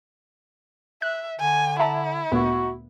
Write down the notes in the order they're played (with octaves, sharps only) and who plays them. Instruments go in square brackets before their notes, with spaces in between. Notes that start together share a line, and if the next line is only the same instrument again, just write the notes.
[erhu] E5 [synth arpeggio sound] F#6
[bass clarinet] D3 [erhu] G#5
[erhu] E4 [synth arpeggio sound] E5 A5 A#5
[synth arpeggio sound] D2 A#2 B3 [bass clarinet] F#4